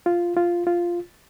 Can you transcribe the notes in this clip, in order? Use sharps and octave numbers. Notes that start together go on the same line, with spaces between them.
F4
F4
F4